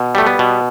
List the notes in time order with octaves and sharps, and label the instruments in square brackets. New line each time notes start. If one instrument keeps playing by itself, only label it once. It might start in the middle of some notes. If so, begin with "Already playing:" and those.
Already playing: [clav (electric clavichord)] B2
G3 A3
B3
B2